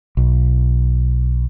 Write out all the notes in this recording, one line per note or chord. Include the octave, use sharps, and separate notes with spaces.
B1